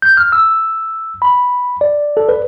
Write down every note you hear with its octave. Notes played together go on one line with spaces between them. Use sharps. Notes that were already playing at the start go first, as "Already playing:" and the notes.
G6
F6
E6
B5
D5
A4
B4